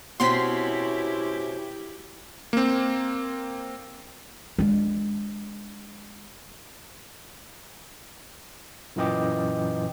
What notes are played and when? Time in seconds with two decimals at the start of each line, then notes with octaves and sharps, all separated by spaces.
0.20 B2 C4 C#4 E4 G4 C6 B6
2.53 A#3 C4
4.59 G#3 D4
8.96 F#2 A#2 E3 D#5 G5 D6